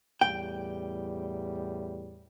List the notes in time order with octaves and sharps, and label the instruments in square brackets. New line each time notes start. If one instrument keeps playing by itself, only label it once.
[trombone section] E2 A2 G3 [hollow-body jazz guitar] G5